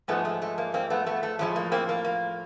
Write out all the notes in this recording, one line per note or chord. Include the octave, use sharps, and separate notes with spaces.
G#2 F3 G#3 A3 B3
A3
A3
A#3
A#3 C4
A3 B3
A3 B3
A3
A2 F3 G#3 A3
A#3
A#3 C4
A#3
A#3